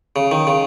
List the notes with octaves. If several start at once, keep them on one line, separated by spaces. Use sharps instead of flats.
C#3
D#3
C#3